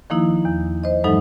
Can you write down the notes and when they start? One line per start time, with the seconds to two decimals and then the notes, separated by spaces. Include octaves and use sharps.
0.10 D#3 F3 A#3 D#4 E4
0.45 E2
0.84 C5 D#5
1.04 G2 E3 F#3 G#3 D#4 A4